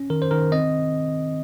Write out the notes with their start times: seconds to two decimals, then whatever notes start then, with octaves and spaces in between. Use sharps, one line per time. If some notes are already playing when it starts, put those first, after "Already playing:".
Already playing: C#4
0.10 D#3 A#4
0.22 C5
0.31 D#3 A#4
0.52 C4 D#5